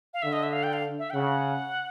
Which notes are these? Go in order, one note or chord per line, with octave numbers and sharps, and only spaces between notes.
F5
D3 E5
D#5
E5
F5
G5
F5
E5
G5
C#3 F#5